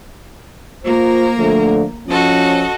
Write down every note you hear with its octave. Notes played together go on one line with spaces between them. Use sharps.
A#3 F4 A#4 C5
D3 F3 A3
F3 C#4 F#4 A4 D#5